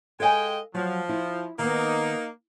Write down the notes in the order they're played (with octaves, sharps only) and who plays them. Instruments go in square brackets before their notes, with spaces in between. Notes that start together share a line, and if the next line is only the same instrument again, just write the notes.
[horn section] G#3 D#5 G5 [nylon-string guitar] A4 F5 G#5
[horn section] F3 [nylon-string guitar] F#3
[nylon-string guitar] E4
[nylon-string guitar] D#3 B3 [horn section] A#3 D#4